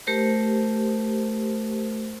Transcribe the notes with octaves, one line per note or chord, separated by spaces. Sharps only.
A3 G4 A#4 C5